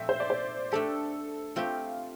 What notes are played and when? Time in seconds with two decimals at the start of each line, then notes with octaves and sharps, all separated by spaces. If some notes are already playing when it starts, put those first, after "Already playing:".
Already playing: A#2 F3 A3 C4 E5
0.09 C5
0.20 D5
0.30 C5
0.72 A3 D4 G4 A4
1.56 A3 C4 F4 G4